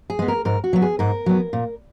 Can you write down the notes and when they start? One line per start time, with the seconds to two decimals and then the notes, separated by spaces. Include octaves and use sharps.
0.10 G#4
0.19 G#3 B3
0.28 A#4
0.45 G#2 A#4
0.64 F#4
0.73 F#3 B3
0.82 G#4
0.99 G#2 A#4
1.26 F#3 B3
1.53 A#2